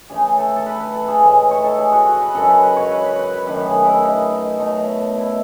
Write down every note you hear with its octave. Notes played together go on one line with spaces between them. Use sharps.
C#3 E3 A3 G#4
A4
A4
B4
B4
A4
G#4
A2 E3 G#3
C#5
A4
G#4
F#4
F#4
B4
F#2 C#3 G#3 A4
B4
B4
C#5
B4
B4
B4
B4
F#2 D#3 A3 B4
G#4
E4
D#4
B2 F#3 A3
E4